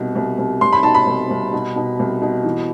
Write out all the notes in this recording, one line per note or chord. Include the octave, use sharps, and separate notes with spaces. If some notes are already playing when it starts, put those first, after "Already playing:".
Already playing: C2 B2
C2
C2
C2 C6
B5
B2 A5
B5
C2
C2
B2
B2
C2
B2
E3